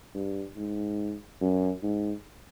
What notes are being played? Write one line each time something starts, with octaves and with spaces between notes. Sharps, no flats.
G2
G#2
F#2
G#2